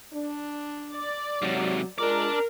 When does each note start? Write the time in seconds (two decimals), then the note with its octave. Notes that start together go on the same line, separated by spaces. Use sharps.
0.13 D4
0.93 D5
1.42 G#2 C3 F#3
1.98 G#3 D4 F4 A#4 D5